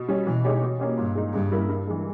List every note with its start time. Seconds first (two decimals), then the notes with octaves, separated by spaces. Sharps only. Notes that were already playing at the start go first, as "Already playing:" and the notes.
Already playing: B2
0.09 G3 C#4
0.26 B2 E3
0.44 G#3 D#4 G4 C#5
0.62 B2
0.80 A#3 C#4 G4
0.98 G2 A#2
1.15 G#3 D#4
1.33 G2 C#3
1.51 G3 A#3 E4 A#4
1.69 G2
1.87 E3 G#3